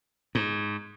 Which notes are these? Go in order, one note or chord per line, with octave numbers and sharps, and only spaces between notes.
G#2